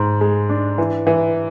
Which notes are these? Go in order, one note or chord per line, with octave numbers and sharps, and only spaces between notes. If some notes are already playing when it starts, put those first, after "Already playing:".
Already playing: G#2 G#3
G#3
D4
E3
E3